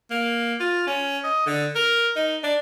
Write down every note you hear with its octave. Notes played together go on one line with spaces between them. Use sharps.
A#3
F4
C#4
D#5
D3
A#4
D#4
D4